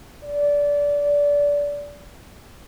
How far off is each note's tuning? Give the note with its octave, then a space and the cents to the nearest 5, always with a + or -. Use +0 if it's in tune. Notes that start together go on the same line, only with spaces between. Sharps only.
D5 -20